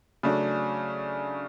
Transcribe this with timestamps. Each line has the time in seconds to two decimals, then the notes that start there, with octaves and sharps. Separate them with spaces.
0.23 C#3 F#3 A3 D4